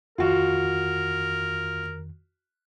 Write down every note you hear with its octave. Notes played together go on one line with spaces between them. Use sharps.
F2 D#3 F4 F#4 A#4